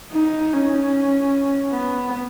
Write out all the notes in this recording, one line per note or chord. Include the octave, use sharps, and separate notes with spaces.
D#4
C#4
B3